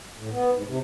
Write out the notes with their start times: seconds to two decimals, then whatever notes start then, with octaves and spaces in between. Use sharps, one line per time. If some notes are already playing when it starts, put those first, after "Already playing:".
0.16 A2
0.32 B3
0.54 G#2
0.68 C3